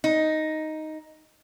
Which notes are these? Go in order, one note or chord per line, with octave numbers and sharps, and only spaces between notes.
D#4